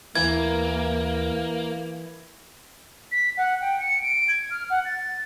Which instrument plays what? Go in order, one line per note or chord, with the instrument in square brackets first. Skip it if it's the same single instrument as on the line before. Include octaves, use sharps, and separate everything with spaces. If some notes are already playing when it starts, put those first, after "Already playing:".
[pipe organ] D#2 A#4 [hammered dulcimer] E3 [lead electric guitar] A#3 [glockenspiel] G#6
[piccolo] B6
F#5
G5
C#7
D7
G#6
F6
F#5
A6